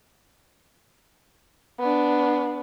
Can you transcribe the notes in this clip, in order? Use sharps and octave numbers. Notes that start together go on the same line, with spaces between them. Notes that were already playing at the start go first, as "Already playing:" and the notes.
B3 D4